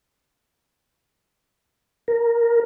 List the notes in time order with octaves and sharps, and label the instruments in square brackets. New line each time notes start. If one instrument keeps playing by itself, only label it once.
[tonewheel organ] A#4